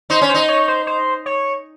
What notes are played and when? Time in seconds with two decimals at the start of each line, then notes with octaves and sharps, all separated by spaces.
0.10 D#4 C5
0.21 C#4
0.29 C5
0.34 D#4
0.48 C#5
0.68 C5
0.87 C5
1.26 C#5